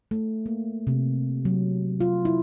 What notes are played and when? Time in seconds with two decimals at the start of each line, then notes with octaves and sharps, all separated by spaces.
0.11 A3
0.46 A#3
0.87 C3
1.45 F#3
2.00 F4
2.25 E4